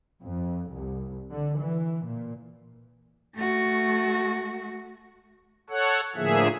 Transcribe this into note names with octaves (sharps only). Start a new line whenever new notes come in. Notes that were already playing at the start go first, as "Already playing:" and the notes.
F2
C2
D3
E3
A#2
A3 F#4
A4 C#5 F#5
A2 D3 F3 A#3 G#4 E5